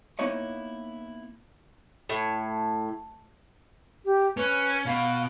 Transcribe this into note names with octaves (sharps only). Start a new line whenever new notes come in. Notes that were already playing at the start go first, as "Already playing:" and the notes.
A#3 B3 D#4 E4 C#5 D#5
A2
G4
C#4 B4
B2 F5